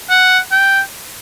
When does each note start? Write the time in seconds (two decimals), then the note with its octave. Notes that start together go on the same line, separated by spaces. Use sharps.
0.10 F#5
0.52 G5